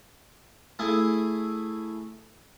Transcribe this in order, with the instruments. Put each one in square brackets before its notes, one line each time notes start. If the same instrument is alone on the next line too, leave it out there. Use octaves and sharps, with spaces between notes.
[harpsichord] A3 E4 G#4